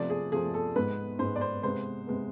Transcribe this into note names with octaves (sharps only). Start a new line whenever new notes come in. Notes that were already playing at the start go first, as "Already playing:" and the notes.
Already playing: C3 F3 A3 D5
G#4
C3 F3 A3 G#4
A4
G#2 G#3 B3 B4
G#2 G#3 B3 C5
D5
C5
C3 G#3 B3 C5
C3 G#3 B3